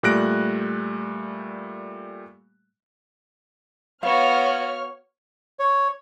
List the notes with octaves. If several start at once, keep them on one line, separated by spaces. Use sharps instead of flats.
A#2 G3 A3 F#6 A#6 D7
B3 F#4 C#5 F5 F6
C#5